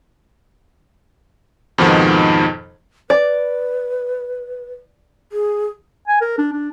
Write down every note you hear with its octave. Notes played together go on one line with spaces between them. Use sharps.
F2 G#2 B2 D#3 F3
B4 D5
G#4
G#5
A#4
D4
D4